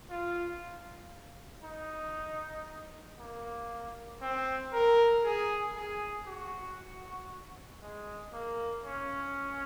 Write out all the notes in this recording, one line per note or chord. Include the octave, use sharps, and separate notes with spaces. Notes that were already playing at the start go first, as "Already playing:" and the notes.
F4
D#4
A#3
C4
A#4
G#4
G#4
F#4
G#3
A#3
C#4